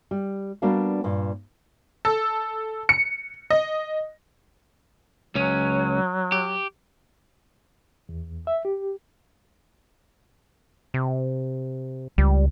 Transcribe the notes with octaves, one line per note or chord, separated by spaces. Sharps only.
G3
G3 A#3 B3 D4 F#4 F5
G2 A#2
A4
C#7
D#5
C#2 F#3 C#4
G4
E2
E5
G4
C3
C#2 G3